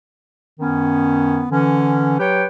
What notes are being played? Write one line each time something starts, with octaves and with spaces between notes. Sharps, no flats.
F#2 D#3 B3 C#4
D3 E3 C#4
F#3 G4 B4 C#5 G5